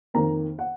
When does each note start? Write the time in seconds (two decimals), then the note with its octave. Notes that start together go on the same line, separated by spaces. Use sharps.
0.14 F2 D#3 A#3 A#5
0.59 F#5